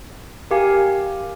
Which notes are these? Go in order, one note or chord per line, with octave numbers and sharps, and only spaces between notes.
G4 A#4 F5 G#5